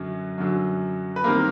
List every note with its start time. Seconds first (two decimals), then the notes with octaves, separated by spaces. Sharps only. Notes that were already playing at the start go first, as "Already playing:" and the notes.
Already playing: F#2 D3 F#3
0.38 F#2 D3 F#3
1.16 B4
1.24 D#3 G3 A#3 C4 A#4